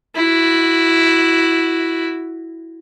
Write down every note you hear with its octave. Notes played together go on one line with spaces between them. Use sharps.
E4 F#4